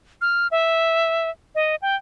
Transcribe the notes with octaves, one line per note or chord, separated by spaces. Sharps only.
F6
E5
D#5
G5